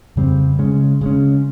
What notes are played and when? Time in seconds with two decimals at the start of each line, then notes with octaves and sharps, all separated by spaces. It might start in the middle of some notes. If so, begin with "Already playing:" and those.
0.16 F2 C#3 G3 C4
0.58 C#3 G#3 C#4
1.01 C#3 G#3 C#4